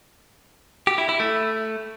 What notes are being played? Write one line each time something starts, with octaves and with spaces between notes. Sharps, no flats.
G4
E4
E4
A3